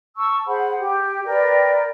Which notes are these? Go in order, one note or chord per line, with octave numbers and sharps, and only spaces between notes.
A5 C#6 E6
G#4 C5 F#5 B5
G4
A#4 B4 D5 G5